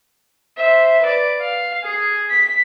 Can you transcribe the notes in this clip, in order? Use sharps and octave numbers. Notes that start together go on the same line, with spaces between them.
C5 E5
B4 D5
F5
G#4
B6